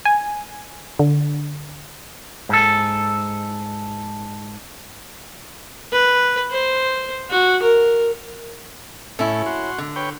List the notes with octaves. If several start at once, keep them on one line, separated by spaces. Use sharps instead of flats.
G#5
D3
G#2 A4
B4
C5
F#4
A#4
A2 C#4 E4 A4
F#4 C6
D3
B4 C#5 G5